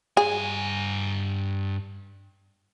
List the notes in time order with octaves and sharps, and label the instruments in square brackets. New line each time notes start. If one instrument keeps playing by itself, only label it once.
[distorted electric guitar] G2 G#5 [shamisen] G#4